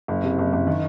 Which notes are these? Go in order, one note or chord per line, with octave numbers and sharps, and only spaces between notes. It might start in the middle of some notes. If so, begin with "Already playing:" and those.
F#1
C3
F#1
F#1
D#3